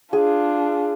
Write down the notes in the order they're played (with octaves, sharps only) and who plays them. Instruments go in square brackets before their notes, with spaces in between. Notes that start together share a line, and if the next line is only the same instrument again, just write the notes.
[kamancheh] D4 F4 [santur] G#4